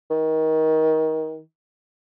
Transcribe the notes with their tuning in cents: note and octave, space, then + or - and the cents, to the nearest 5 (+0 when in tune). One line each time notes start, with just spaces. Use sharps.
D#3 +25